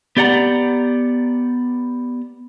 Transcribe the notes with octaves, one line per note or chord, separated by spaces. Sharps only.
B3 G4 D5 F#5 A#5